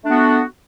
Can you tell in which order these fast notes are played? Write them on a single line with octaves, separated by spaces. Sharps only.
A3 D4 B3 F#4